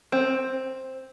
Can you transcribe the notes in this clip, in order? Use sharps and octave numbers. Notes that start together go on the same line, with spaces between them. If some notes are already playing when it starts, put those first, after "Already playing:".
C4